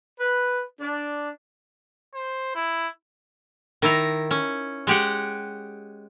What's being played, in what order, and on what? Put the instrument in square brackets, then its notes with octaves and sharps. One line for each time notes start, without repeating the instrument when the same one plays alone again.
[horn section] B4
D4
[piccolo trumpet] C5
E4
[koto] D#3 E4 A#5
C#4
G#3 G4 F#5